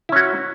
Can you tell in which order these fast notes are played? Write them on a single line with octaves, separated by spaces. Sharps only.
E4 C#4 F#4